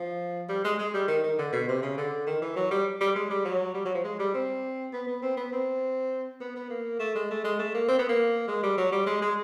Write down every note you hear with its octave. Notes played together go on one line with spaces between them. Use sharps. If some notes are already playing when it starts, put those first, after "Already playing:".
Already playing: F3
G3
G#3
G#3
G3
D#3
D#3
D3
B2
C3
C#3
D3
D#3
E3
F#3
G3
G3
G#3
G3
F#3
G3
F#3
F3
G#3
G3
C4
B3
B3
C4
B3
C4
B3
B3
A#3
A3
G#3
A3
G#3
A3
A#3
C4
B3
A#3
G#3
G3
F#3
G3
G#3
G#3